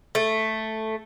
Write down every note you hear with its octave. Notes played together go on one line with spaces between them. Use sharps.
A3